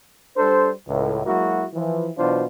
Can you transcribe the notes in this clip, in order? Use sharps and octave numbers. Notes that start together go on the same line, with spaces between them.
G3 D4 A4 C5
C#2 A2
F#3 G#3 A#3 E4 F#4
E3 F3
B2 E3 F#3 D4 F4 C5